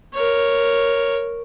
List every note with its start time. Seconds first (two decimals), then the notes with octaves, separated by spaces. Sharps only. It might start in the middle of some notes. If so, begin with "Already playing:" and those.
0.14 A#4 C#5